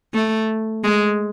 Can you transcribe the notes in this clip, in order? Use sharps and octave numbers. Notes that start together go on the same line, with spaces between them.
A3
G#3